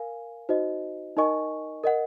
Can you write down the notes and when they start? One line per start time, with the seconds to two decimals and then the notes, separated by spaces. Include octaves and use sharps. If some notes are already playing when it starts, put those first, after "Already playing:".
Already playing: A#4 F5 G#5
0.49 D#4 F#4 C5 D#5
1.17 D#4 A#4 D#5 G#5 C#6
1.84 A#4 D#5 F#5